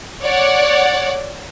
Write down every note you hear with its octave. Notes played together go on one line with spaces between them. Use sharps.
C#5 D5 F#5